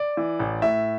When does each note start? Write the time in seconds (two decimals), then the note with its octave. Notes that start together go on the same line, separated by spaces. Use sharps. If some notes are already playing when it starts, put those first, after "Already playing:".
Already playing: D5
0.17 E3
0.40 A1
0.62 A2 E5